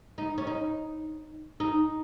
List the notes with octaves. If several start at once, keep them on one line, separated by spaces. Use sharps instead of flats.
D#4
C#4
D#4
D#4